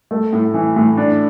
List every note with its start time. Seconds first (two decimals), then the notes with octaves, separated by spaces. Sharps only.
0.11 A3
0.33 A2
0.54 E3
0.76 A2
0.97 D4